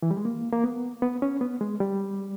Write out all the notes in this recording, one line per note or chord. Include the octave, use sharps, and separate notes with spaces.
E3
G3
G#3
A#3
A#3
B3
B3
C#4
B3
G#3
G3